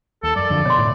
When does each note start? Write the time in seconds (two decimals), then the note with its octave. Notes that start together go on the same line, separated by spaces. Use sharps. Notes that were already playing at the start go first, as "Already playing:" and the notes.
0.23 D#2 A4
0.36 F#2 D5
0.50 F2 D3
0.65 B2 C#5 C6
0.78 A2